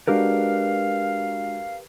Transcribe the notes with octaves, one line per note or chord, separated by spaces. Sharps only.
G#3 D4 F#4 G4 A#4 B4 F5